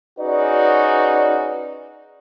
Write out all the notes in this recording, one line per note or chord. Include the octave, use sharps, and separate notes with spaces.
C#4 D#4 F#4 G#4 B4 D5